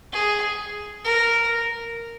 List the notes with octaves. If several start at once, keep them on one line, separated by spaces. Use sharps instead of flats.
G#4
A#4